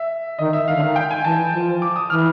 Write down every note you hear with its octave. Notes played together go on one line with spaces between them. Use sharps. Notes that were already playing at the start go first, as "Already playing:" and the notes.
Already playing: E5
D#3 D#5
E5
D#3 F5
D3
D#3 F5
G5
G#5
E3 A5
F3
D6
D#6
E3 F6